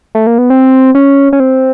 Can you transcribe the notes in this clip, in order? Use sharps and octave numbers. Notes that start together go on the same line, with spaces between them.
A3
A#3
B3
C4
C#4
C#4
C4